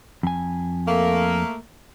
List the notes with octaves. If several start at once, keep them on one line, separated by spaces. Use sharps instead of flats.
F2 G#5
A3 A#3